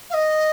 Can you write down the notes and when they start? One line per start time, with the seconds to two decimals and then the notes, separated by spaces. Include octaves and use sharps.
0.10 F5
0.14 D#5